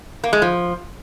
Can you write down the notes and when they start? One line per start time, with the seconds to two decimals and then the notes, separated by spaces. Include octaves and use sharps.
0.24 A#3
0.33 G#3
0.42 F3